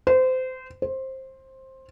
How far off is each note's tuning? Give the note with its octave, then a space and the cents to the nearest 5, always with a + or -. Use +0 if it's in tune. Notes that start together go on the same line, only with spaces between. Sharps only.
C5 -25
C5 +15